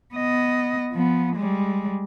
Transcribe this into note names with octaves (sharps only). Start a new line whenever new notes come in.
B3 D#5
F3 B3
G3 G#3